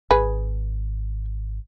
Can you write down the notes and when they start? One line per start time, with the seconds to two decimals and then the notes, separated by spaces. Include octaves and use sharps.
0.11 G#1 G#4 B4